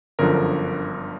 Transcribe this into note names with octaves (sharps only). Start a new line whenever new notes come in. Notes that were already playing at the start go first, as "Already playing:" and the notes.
G1 F#2 D3 F3 A#4